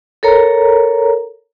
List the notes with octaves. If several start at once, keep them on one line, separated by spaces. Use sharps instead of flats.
A4 A#4 C#5 A#5